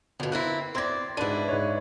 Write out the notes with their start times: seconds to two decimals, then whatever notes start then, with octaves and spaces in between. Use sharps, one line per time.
0.20 G1 F2 B2 B4
0.32 A#3 C4 E4 F#6
0.75 C4 D5 C6 G#6 A#6
1.17 G#2 D4 E4 B4 D#7
1.48 G#2 B4 C#5